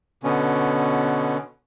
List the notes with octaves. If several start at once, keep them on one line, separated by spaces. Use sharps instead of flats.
B2 D3 B3 C#4